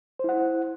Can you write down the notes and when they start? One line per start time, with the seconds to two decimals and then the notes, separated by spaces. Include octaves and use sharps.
0.19 C5
0.24 E4
0.29 F#5